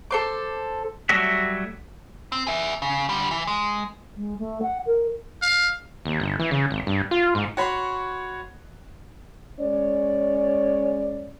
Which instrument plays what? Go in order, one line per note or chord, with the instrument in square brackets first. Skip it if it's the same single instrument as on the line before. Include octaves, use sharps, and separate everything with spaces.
[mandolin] A4 C5 D6
[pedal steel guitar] F#3 G3 A3 F#4 E5
[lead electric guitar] C4
G#4 E5
C#3
D3 G3
E3
G#3
[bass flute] G#3
A3
F#5
A#4
[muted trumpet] F5
[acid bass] D#2
G1
E3
C#3
G#1
G2
F4
G#2
[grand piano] F#4 C#5 B5 C6
[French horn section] G#3 C#4 C#5 D5